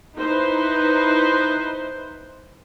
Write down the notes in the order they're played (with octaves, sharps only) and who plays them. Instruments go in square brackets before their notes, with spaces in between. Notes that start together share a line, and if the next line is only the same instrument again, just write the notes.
[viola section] D#4 E4 B4 C5